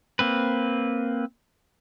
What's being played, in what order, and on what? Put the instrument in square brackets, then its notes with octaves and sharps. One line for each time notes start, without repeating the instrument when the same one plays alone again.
[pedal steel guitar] A#3 C4 B4